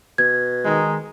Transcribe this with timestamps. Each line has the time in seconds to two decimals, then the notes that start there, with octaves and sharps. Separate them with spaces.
0.18 B2 G#6
0.65 D#3 G#3 D#4